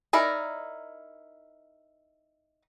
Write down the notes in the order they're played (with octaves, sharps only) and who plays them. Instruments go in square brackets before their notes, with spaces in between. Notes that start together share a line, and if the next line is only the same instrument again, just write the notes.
[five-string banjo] D#4 E4 A#4 D5